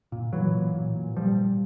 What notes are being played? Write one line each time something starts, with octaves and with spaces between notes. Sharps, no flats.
A#2
A#2 E3 F#3
A#2
A#2
A#2
A#2 F3 G3
A#2